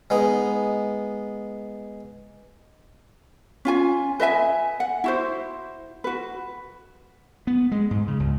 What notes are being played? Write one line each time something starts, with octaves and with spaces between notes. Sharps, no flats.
G#3 B3 D#4
C#4 F4 G#5
B4 D#5 E5 G#5
F#5
E4 F#4 C5
F#4 B4
B3
G#3
G#2
C#3
C#2